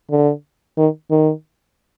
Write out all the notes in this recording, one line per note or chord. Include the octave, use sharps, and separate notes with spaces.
D3
D#3
D#3